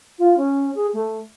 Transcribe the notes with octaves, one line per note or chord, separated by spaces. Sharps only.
F4
C#4
G#4
A3